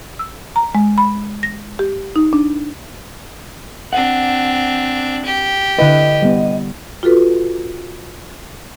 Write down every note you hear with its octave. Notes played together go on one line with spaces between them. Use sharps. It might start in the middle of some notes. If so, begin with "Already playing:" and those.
E6
A#5
G#3
B5
A#6
G4
D#4
D4
C4 D4 F#5
G4
D3 E4 B4 D#5
G3 B3
F4 F#4 A4 B4